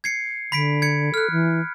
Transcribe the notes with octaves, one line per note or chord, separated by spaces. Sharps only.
G#6 C7 C#7
D3 B5 B6 D7
G#6 C#7
A4 F6 F#6
E3